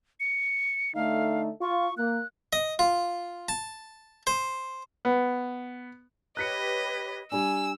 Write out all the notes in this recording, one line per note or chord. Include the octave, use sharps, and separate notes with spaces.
C#7
D3 A3 D#4 F5
F4 C#6
A#3 F#6
D#5
F4
A5
C5
B3
G4 B4 C#5 D#5 F#6 B6 C#7
G3 D4 G#5 E6